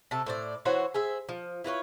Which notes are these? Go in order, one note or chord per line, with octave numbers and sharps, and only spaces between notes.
C3 A3 A5
A2 C5 D5
E3 F#4 C5 C#5
G#4 C5 E5
F3
E4 F4 B4 C#5